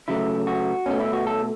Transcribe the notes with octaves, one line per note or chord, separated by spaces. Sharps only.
C#3 F#3 A3 E4
F#4
B2 A3 C#4
E4
F#4
A4